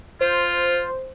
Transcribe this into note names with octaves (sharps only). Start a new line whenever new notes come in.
F4 C5